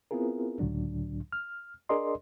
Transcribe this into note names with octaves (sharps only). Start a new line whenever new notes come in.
B3 C4 E4 F4 G#4 A#4
C#2 A2 D3 F#3 D4
F6
D4 G#4 A#4 D5 D#5 C6